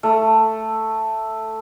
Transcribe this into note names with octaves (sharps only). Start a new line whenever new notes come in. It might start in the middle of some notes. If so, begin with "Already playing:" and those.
A3